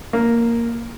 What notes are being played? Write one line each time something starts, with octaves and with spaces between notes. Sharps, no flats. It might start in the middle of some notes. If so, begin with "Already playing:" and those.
A#3